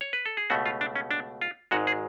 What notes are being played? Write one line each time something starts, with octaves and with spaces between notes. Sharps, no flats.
C#5
B4
A4
G#4
C#2 B2 A3 F#4
F4
D4
C#4
D4
F4
G#1 G#2 G#3 F#4
G#4